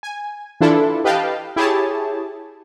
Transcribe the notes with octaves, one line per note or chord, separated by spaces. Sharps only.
G#5
E3 D4 E4 F4 A4
G4 B4 D#5 F5 G5 A5
E4 G4 G#4 C#5 A5